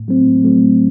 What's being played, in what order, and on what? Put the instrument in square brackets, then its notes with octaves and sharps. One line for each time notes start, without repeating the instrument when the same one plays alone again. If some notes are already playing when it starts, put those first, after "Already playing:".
Already playing: [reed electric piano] A2
F#3 A3 C4
A2
F#3 A3 C4
A2